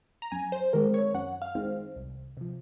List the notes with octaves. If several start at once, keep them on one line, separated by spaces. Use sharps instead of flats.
A#5
F#2 G#5
C5
D#3 G#3 C4 A#4
C#5
F#2 F#5
F5
D#3 G#3 C4
C2
C3 F3